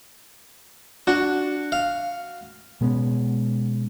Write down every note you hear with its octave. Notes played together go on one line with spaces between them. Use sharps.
D4 F#4
F5
B2 G#3 B3 C#4